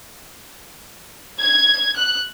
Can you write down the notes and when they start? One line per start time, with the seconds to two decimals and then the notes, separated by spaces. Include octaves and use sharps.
1.40 G#6
1.96 F#6